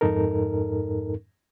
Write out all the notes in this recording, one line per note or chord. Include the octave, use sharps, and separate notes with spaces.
F2 G#2 D#4 A4 A#4